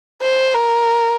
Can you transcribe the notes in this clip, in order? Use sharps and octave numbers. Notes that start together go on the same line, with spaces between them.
C5
A#4